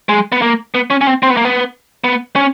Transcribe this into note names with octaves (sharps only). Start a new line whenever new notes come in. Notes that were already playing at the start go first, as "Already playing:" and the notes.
G#3
B3
A#3
B3
C#4
C#4
C4
C4
B3
A#3
B3
B3
C#4